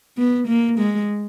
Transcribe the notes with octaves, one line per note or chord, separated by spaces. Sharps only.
B3
A#3
G#3